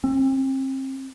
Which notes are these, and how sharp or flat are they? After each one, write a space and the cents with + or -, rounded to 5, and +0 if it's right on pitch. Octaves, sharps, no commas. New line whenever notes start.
C4 +35